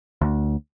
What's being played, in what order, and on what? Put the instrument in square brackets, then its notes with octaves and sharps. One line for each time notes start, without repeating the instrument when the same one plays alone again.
[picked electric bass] D2